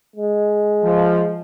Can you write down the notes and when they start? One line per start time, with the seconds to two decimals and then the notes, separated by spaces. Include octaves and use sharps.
0.16 G#3
0.84 F3